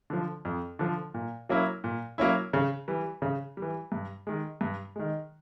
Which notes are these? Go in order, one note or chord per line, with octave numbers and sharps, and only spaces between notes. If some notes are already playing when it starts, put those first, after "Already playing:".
D3 F3
F2
D3 F3
A#2
F#3 A#3 C#4 E4
A#2
F#3 A#3 C#4 E4
C#3
E3 G3
C#3
G3
E3
G2
D#3 G#3
G2
D#3 G#3